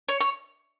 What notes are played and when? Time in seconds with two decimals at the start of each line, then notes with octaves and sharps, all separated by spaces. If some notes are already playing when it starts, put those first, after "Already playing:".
0.08 C#5
0.20 C#5